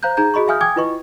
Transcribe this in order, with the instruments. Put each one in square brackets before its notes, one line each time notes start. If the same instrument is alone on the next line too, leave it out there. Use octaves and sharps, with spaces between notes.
[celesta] C5 F5 A#5 F#6 G6
D#4 G#4 A#5 G6
F#4 G#4 D#5 B5 C#6
E5 F5 G#5 D#6 F6 G6
G5 G#5 D6 D#6 G#6
E4 F4 B4 D#5 C#6